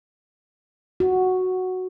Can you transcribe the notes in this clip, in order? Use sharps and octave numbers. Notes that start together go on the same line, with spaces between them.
F#4